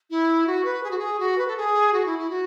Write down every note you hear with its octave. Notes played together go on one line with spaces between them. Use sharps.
E4
F#4
B4
G#4
F#4
G#4
F#4
B4
A4
G#4
F#4
E4
E4
F#4